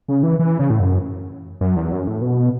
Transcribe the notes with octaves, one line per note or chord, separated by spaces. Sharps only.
C#3
E3
E3
C#3
A2
F#2
F#2
E2
F#2
A2
B2